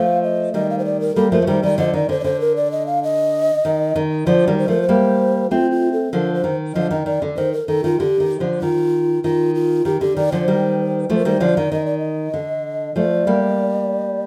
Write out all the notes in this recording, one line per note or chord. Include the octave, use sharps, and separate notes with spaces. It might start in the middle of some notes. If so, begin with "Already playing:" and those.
Already playing: F3 A3 F5
D#5
D#3 G3 D#5
F5
C5
D5
A#4
G3 A#3 A4
F3 A3 A#4
A3
D#3 G3 C5
D#3 G3 D5
D3 F3 D#5
D#3 D5
D3 C5
D5
D3 C5
A#4
D5
D#5
F5
D#5
D#3
D#3
D3 F3 D5
D#3 G3
C5
F3 A3 A#4
C5
G3 A#3
A3 C4 F4
F4
A4
D3 F3 A#4
C5
D#3
D3 F3 D#5
D#3 D#5
D#3 D5
D3
D#3 C5
A#4
D#3 A4
D#3 F4
D3 G4
D#3
D3 F3
D#3 F4
D#3 F4
F4
D#3 G4
D3 G4
D#3 D5
D3 F3 C5
D#3 G3
F3 A3 C5
A#4
D#3 G3 C5
D3 F3 D5
D#3
D#3 D#5
D5
D#5
D3
F3 A3 D5
G3 A#3